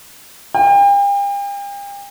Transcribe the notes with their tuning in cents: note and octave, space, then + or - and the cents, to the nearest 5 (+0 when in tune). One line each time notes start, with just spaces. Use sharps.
G5 +40